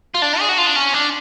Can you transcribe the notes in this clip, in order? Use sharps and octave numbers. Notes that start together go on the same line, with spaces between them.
F4
D4
G#4
F#4
F4
D4
C#4
D4